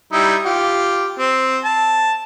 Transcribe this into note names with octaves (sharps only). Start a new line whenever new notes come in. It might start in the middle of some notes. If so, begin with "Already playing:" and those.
G3 D#4 E4
F4 G4
C4
A5